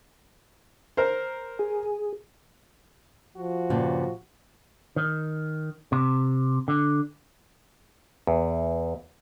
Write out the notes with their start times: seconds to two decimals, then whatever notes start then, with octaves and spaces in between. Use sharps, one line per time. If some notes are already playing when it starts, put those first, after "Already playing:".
0.97 A#4 C5
1.59 G#4
3.37 F3 F#4
3.70 G2 A#2 C#3
4.96 D#3
5.92 C3
6.68 D3
8.27 E2